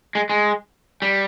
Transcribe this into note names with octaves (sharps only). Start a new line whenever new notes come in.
G#3
G#3
G3